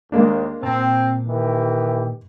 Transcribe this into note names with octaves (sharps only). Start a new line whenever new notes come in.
D#2 G#3 A#3 D4
A#2 C4 A5 A#5
D#3 E3 G4